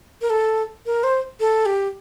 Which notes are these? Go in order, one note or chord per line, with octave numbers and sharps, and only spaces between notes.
A#4
A4
A#4
C5
A4
G4